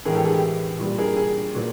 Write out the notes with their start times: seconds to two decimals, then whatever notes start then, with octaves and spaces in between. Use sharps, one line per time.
0.05 A2 E3 G#3 G#4 A#4
0.15 G4 A4
0.24 G#4
0.34 G4
0.79 A#2 G3 A#3
0.98 G#4 A#4
1.16 G#4
1.55 A#2 F#3 A#3